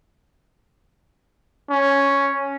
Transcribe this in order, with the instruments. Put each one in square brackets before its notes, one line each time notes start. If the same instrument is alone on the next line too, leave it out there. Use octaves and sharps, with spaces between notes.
[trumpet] C#4